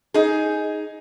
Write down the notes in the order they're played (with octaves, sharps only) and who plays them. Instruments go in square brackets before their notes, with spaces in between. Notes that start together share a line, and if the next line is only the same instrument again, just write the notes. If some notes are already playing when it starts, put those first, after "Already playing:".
[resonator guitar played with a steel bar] D#4 G#4